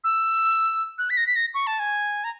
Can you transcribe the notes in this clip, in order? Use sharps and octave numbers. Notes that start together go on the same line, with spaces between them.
E6
F#6
B6
A#6
B6
A#6
C#6
A5
G#5
A#5